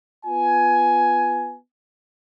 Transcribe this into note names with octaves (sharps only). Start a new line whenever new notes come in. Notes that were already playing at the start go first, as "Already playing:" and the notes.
B3 F4 G#5